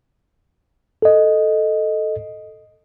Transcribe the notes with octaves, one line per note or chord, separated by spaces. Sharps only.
A4 D#5